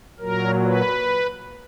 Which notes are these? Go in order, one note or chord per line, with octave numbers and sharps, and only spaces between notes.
A#2 F#3 A#4
B4